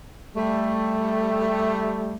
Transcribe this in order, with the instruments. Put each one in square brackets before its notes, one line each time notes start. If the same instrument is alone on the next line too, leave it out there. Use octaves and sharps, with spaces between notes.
[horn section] G3 A3